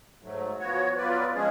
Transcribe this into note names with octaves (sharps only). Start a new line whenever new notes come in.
G#2 F#3 A3
F3 B3 F#4 C#5
F#3 B3 F4 B4 D5
F3 G#3 C#4 G#4